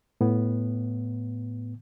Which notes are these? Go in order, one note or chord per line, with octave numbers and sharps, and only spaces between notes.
A2 B3